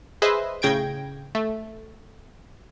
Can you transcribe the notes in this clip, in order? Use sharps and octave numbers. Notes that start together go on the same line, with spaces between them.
G#4 B4 C5 D#5 E5
A2 C#3 G5 G#6 A#6 D7
A3